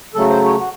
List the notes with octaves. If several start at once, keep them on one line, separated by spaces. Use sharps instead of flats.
C#3 F#3 A3 A4
C5
C#5
F#4